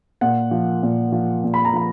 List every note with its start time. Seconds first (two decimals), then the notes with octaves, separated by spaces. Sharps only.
0.21 A#2 F#5
0.51 F3
0.83 A#2
1.12 F3
1.44 A#2
1.54 B5
1.65 A#5
1.73 F3 B5